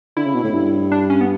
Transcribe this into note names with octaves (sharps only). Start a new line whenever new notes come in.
D3 E4
C#3
B2
A2
G2
D4
C#4
B3